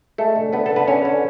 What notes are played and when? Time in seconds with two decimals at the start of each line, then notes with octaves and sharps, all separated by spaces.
0.18 G#3 A3 A4
0.36 D3
0.53 D3 B3 B4
0.66 D3 A4
0.76 B4
0.88 D3 C#4 C#5
1.05 D3